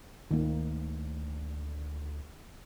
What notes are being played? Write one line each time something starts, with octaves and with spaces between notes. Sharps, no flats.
D2 D#3 A#3